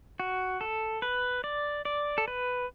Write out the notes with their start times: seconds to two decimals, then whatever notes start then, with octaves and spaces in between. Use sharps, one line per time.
0.20 F#4
0.61 A4
1.02 B4
1.44 D5
1.85 D5
2.18 A4
2.28 B4